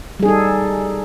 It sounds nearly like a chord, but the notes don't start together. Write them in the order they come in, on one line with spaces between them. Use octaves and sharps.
G3 G#4 D#4 A4